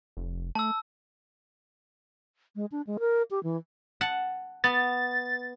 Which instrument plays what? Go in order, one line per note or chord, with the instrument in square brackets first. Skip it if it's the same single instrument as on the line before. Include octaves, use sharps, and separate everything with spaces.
[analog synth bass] F1
[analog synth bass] A3 [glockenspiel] A5 E6
[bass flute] G#3
D4
G#3
A#4
G4
E3
[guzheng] F#5 A5
[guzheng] B3 [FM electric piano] A6